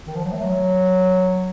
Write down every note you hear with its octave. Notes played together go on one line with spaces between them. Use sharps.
D#3
F3
F#3
A3
F#3